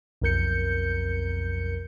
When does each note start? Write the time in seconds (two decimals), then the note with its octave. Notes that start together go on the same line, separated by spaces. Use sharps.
0.21 B1 F2 A#4 G6 C#7